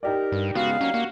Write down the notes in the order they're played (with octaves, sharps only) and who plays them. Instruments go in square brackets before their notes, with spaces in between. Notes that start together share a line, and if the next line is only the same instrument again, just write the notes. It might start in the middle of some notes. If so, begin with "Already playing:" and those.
[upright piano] D#4 G4 D5 [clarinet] A#4
[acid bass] G2
[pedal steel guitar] C#3 G#3 B3 [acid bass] F#4 [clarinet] F5
[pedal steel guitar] F#3 A#3 [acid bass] C#4
[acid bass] A#3 [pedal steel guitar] F#4